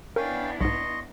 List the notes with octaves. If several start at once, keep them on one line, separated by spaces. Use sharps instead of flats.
B3 C#4 D4 E4 A#4 F5 G5
B1 G#2 D#5 C6 C#6